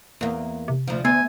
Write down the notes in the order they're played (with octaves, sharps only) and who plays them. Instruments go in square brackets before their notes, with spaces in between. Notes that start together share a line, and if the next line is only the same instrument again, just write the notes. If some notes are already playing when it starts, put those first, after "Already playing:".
[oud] E2 A#3
[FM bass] C3
[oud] D2 F3
[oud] D2 [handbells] B3 [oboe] G#5